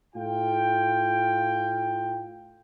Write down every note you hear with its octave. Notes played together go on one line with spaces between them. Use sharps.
A2 F4 G5